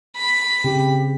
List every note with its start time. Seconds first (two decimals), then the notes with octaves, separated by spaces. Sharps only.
0.16 B5
0.64 C#3 C4 G4